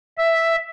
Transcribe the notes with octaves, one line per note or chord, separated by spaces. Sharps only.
E5